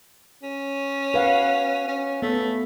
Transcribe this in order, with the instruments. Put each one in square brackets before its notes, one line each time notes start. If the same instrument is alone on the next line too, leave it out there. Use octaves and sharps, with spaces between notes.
[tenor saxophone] C#4
[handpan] B4 F5 F#5
[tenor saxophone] C#4
[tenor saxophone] A3 [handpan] B3